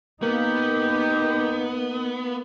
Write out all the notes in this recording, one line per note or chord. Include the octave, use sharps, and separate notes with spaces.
A#3 B3 D#4 G4